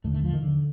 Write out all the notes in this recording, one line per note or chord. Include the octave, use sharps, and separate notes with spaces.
D#2 D3 A3
A3
F3
D#3
D3